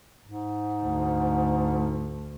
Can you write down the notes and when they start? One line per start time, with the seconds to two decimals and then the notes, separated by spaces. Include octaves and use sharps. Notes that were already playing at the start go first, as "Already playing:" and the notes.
0.24 G#2
0.83 D2